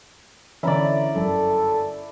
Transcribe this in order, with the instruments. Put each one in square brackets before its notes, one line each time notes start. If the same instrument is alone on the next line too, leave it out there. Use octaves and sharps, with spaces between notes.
[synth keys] D3 E3 [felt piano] C#4 A#5 [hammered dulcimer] E4 D5
[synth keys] G1 [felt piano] F#2 [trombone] A4